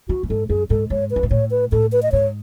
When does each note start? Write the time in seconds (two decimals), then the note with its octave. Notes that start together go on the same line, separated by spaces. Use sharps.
0.09 E3 F#4
0.23 A2
0.30 G#2 A4
0.49 F#2 G#4
0.70 G#2 A4
0.90 G#2 C#5
1.11 B4
1.16 F#2
1.23 G#2
1.31 A2 C#5
1.51 B4
1.72 A2 A4
1.92 B4
2.03 D#5
2.12 G#2 C#5